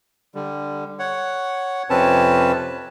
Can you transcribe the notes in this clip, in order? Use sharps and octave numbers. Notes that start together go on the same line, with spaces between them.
D3 G3
C#5 F#5
F2 C3 C4 C#4 B4 A5